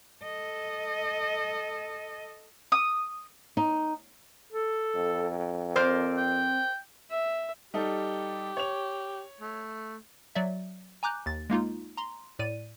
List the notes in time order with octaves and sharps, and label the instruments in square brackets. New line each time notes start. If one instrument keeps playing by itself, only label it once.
[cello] A4 D#5
[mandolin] D#6
[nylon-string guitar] D#4
[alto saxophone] A4
[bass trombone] F2
[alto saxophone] C4 [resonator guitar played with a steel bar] A#4 C5 D5
[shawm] G5
[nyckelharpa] E5
[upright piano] G3 D#4 A4 [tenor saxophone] G4
[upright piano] C#5 F7
[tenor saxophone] A3
[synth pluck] F#3 D5 E5
G#5 A#5 D6 F#6 G6
D#2 A6
G#3 A#3 D#4 F4
A#5 C6
A2 D5 D#7